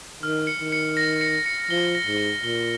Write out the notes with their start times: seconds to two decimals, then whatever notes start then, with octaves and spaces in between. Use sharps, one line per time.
0.23 D#3 F6
0.47 C#7
0.60 D#3
0.72 C#7
0.97 A#6
1.21 C#7
1.46 C#7
1.70 F3 G7
1.95 A#6
2.07 G#2
2.18 G7
2.43 A#2 G7